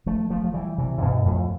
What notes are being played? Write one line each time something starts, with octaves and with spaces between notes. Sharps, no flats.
F3 A3
F3 A3
F3
E3 G3
C3 E3
C3
G2 B2
F2 A2